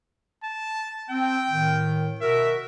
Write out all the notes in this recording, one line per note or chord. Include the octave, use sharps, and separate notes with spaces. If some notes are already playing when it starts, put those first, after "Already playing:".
A5
C4 G5
A2 D#3
B2 F#4 A#4 E5